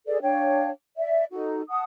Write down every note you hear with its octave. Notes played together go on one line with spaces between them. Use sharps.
G#4 A4 B4 D5
D4 C#5 F5 G5
D5 E5
D#4 F#4 A4
F#5 A5 D#6